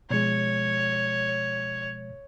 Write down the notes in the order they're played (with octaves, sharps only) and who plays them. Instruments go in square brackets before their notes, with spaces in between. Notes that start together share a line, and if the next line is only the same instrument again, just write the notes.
[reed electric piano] B2 F3 G#3 [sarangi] C#5